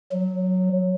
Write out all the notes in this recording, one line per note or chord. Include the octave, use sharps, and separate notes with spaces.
F#3